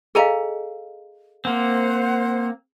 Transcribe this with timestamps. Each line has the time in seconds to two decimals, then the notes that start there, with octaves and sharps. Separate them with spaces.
0.15 G#4 A4 D#5 F5 G#5 A#5
1.45 A#3 C4 C5 F#5